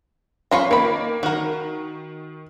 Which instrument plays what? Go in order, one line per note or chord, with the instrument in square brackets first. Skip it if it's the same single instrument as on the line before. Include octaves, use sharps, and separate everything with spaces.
[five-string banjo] C#4 F4 A#5 [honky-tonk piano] C5 B5 C#6
[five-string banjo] D#3 B5 [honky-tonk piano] A#3
[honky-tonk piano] D#3 [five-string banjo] F#4 A#4